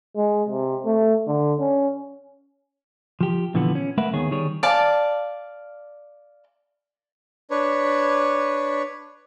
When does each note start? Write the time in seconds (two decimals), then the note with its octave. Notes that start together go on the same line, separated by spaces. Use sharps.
0.16 G#3
0.48 C3
0.85 A3
1.27 D3
1.60 C#4
3.21 F3 G4
3.54 A#2 D3 E3 F3 B3
3.75 C#4
3.97 G#3 A3 A#4 B4 E5 F#5
4.13 D#2 D#3 B3 G#4 C#5
4.31 D#3 G3 G#4 C#5
4.63 D5 F5 A5
7.51 D4 B4 C#5